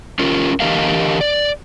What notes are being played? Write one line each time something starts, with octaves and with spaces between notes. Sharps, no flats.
C#4 F4 A#4
D3 E3 G4 A#4 D#5 F5
D5